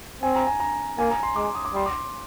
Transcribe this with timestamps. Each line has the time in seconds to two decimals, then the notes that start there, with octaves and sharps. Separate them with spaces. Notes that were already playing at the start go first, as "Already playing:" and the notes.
0.22 C4 G#5
0.35 A#5
0.47 G#5
0.60 A#5
0.99 A#3 G#5
1.11 A#5
1.23 C6
1.36 G#3 D6
1.55 D#6
1.65 D6
1.73 G3 C6
1.86 D6